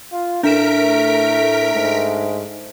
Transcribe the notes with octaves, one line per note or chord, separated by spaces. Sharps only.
F4
A2 A3 D4 A#4 B6 D7 E7
G#2